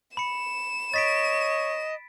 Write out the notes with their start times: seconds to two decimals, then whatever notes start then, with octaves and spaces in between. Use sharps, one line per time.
0.17 B5 C#7 E7
0.94 C#5 D#5 A6 B6 D7